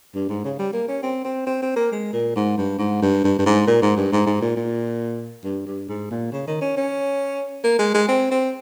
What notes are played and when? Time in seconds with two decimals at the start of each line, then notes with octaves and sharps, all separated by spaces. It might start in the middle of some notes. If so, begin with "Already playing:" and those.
0.15 G2
0.29 G#2
0.44 C#3
0.59 G3
0.73 A#3
0.88 C#4
1.03 C4
1.25 C4
1.47 C4
1.62 C4
1.76 A#3
1.92 G#3
2.13 A#2
2.36 G#2
2.58 G2
2.79 G#2
3.02 G2
3.24 G2
3.39 G2
3.46 G#2
3.67 A#2
3.82 G#2
3.96 G2
4.12 G#2
4.26 G#2
4.42 A#2
4.56 A#2
5.44 G2
5.66 G2
5.89 G#2
6.11 A#2
6.32 C#3
6.47 D#3
6.61 C#4
6.77 C#4
7.64 A#3
7.79 G#3
7.94 G#3
8.08 C4
8.31 C4